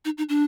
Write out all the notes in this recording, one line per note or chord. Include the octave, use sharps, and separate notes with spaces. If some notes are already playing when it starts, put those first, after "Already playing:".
D#4
D#4
D4